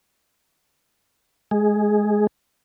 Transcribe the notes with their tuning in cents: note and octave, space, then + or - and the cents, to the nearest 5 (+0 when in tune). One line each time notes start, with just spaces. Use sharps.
G#3 +15 G#4 +0